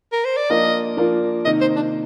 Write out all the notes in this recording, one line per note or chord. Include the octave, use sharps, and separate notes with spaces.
A#4
C5
D5
F3 A#3 D4 F4 A#4 D#5
F3 A#3 D4 F4 A#4
C3 D#3 A#3 D#4 D#5
C5
D4